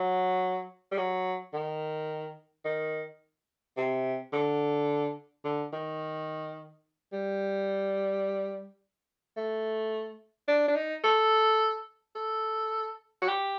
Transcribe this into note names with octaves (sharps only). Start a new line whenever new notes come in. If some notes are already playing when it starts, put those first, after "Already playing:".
Already playing: F#3
G3
F#3
D#3
D#3
C3
D3
D3
D#3
G3
A3
D4
D4
D#4
A4
A4
F#4
G4